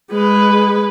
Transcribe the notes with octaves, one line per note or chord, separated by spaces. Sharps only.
G#3 B4